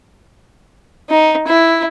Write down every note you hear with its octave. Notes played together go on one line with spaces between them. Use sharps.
D#4
E4